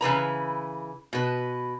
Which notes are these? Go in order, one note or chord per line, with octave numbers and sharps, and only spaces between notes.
C#3 E3 B4 A#5
B2 B4